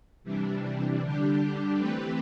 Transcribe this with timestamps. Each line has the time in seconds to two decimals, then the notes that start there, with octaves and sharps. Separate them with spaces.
0.24 C3 E3 G3 D4
1.01 D3 G3 D4 G4
1.79 E3 A3 C4 G4 B4